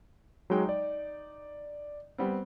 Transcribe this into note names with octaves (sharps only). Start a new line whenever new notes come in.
F#3 G#3 D#4 G5
D5
G3 B3 C4